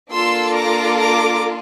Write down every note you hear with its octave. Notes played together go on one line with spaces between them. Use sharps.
A#3 D4 F4 A4 C6 E6
A#5 D6
A#5 D6